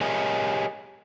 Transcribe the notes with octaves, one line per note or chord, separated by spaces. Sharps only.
G4 G#4 A#4 C#5 D#5 G#5